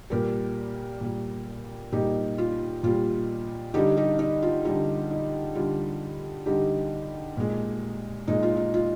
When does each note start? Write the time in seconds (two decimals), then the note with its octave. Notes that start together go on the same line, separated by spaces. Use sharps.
0.10 A#2 G3 G4 A#4
1.01 A#2 G3
1.92 A#2 G3 D#4 G4
2.38 F4
2.83 A#2 G3 F4
3.74 D3 G3 D#4 G4
3.97 D#4 G4
4.19 D#4
4.42 F4
4.65 D3 G3 D#4
5.11 D#4
5.55 D3 G3 F4
6.46 D3 G3 D#4 G4
7.37 A#2 G#3
8.28 A#2 G#3 D#4
8.43 F4
8.57 D#4
8.74 F4